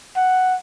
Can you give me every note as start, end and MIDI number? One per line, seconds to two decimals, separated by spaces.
0.17 0.56 78